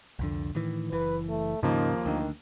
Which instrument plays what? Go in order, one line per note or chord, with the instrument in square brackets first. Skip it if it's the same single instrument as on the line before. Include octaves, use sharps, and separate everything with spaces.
[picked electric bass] C2 F2 D3
A2 D#3 E3
[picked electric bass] F#1 E3 [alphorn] B4
[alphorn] A3
[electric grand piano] D#2 F3 A#3 [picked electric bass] G#2 C#3 C#4 [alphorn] D#4
[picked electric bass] D2 D4 [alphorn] D#3